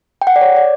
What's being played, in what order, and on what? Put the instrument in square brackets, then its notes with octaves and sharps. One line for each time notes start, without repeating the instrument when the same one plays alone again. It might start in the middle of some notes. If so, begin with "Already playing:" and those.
[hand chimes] G5
F#5
D5
C#5
D5